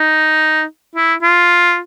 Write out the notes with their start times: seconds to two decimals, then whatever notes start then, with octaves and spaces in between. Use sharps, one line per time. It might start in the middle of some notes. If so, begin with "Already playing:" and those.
Already playing: D#4
0.96 E4
1.22 F4